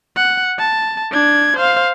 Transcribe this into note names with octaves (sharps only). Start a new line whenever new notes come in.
F#5
A5
D4 G#6
C5 F5